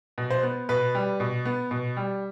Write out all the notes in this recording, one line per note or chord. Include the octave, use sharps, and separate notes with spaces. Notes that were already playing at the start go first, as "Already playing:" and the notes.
B2
C5
B3
B2 B4
G3
B2
B3
B2
G3